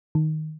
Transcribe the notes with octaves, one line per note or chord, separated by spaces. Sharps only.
D#3